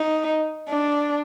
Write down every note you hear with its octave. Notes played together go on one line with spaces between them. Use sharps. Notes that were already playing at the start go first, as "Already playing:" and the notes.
Already playing: D#4
D4